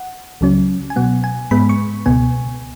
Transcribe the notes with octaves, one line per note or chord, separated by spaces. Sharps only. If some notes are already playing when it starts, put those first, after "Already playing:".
Already playing: F#5
C#2 C#3 F#3 C#4
G#5
B2 F#3 B3 F#5
G#5
G#2 G#3 B3 B5
C#6
C#2 B2 B3 G#5